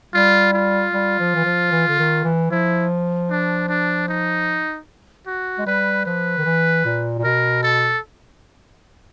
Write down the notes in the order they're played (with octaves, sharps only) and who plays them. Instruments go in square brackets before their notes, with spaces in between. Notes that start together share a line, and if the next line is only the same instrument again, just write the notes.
[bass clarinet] G3 [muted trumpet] F4
[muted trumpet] F4
[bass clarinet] G3
F3
E3
F3
E3
D3
D#3
E3
[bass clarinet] F3 [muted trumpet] E4
[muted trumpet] D4
D4
D#4
F#4
[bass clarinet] G#3
[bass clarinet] G3 [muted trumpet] B4
[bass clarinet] F3 [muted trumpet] B4
[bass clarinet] D#3
E3
A#2
A#2
[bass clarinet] B2 [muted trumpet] A#4
[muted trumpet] A4